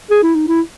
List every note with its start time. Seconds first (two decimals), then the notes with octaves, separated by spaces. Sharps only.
0.10 G#4
0.23 E4
0.35 D#4
0.48 E4